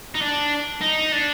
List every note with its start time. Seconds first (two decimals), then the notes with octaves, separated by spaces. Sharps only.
0.14 D#4
0.21 D4
0.81 D#4
1.12 D4